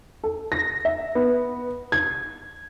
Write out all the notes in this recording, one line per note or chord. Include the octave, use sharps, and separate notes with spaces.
A4
A#6
E5
B3
G#6